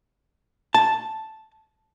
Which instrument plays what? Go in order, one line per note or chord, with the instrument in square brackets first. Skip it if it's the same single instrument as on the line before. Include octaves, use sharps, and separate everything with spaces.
[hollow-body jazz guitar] A5